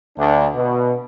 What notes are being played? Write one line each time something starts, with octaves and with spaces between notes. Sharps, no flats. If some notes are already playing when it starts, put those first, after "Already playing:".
D2 D4
B2